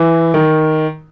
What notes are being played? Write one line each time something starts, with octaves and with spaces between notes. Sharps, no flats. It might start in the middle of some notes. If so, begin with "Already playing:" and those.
Already playing: E3
D#3